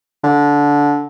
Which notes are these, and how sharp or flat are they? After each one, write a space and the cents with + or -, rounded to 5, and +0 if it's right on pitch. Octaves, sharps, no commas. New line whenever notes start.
D3 -15